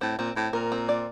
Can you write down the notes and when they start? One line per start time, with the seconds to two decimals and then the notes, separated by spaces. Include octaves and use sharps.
0.01 A2 C4
0.18 A#2 C4
0.36 A2 C4
0.53 A#2 A#4
0.72 C4
0.89 D5